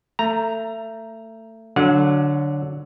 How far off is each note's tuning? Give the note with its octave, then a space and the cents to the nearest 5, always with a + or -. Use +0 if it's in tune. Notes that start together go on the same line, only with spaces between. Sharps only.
A3 +25 A#5 +0
D3 +0 F#3 +0 F#5 -40